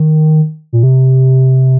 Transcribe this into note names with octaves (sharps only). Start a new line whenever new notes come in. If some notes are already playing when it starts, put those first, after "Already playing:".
Already playing: D#3
A#2
C3